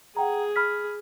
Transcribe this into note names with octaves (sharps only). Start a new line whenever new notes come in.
G#4 F#5 G5 A#5
B5 F6 B6